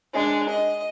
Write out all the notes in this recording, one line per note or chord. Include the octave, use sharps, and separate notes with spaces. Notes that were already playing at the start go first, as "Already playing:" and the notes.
G#3 D4
D#5